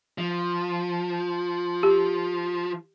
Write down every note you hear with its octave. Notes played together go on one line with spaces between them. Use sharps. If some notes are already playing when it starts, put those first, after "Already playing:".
F3
G4